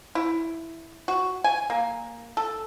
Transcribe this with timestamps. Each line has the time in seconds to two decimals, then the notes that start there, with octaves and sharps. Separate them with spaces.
0.15 E4
1.08 F#4
1.44 G#5
1.70 A#3
2.37 A4